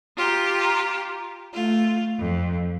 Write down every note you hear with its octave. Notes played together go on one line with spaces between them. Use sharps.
F4 G4 A#5
A3 F4
F2